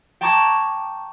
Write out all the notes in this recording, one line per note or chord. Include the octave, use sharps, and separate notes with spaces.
G5 A5 A#5 C#6 D6 G#6